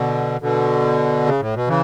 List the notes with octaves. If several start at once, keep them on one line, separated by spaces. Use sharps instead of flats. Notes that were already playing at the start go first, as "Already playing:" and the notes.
Already playing: B2 D3
B2 D3
C#3
A2
B2
C#3 E3